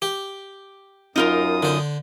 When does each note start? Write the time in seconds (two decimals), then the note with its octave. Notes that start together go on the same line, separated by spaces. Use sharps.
0.02 G4
1.16 F#2 D#4 F4 A#4 D#6
1.63 D3 C5